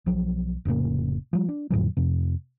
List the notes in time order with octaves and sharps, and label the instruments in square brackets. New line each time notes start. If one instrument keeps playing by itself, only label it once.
[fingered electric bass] B1 F3 F#3
F1 A2 C#3 A#3
F3 G3
D4
F2 A2 D3 F#3
F2 C3